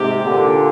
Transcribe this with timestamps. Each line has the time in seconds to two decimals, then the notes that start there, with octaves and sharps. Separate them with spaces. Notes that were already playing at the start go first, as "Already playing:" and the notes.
Already playing: G#2 C3 G4
0.23 A#2 D3